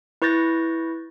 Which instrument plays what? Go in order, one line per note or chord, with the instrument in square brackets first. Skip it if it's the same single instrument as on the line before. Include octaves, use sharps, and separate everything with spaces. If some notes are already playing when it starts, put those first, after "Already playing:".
[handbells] E4 B4 C#6 G6 A6 A#6